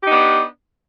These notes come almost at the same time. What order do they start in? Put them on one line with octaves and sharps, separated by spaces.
G4 D#4 B3 D4